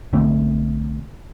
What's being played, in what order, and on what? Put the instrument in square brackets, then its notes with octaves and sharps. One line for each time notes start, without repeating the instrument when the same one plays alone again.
[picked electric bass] B1 D3 A3 C4